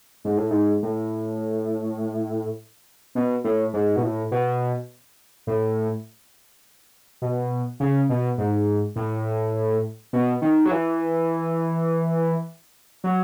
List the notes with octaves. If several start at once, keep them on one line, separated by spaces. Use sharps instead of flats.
G#2
A2
G#2
A2
B2
A2
G#2
B2
A2
B2
A2
B2
C#3
B2
G#2
A2
B2
D#3
F#3
E3
F#3